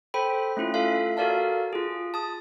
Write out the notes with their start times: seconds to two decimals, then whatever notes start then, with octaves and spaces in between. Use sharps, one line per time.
0.14 A4 C5 G5 B5
0.57 A3 C#4 E4 F4
0.74 F4 A4 E5 F5
1.17 F#4 A4 A#4 D5 F5 A5
1.73 F4 G#4
2.14 A5 D#6